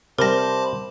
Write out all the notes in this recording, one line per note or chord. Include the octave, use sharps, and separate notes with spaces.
C3 G3 A#4 C5 A5 B5 D6 A#6